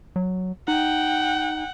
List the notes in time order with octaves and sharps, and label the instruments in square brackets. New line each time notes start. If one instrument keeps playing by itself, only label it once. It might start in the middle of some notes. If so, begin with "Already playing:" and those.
[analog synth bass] F#3
[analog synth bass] D#4 [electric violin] F#5 G5